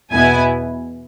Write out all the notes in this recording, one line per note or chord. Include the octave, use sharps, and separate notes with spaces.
E2 B2 B3 E4 G#5